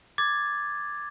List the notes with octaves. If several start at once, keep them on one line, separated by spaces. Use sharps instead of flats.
D6 G#6 A6